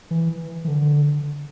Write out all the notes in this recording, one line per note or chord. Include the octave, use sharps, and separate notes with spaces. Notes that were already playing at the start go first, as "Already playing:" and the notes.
E3
E3
D3